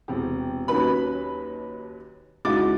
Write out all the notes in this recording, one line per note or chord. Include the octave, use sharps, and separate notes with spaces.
E1 C3 G4
D#2 F#3 C#4 D#4 B4 B5
C#2 D#4 E4 F#4 D6 A6